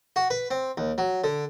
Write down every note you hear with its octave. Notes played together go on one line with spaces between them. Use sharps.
F#4
B4
C4
D#2
F#3
D3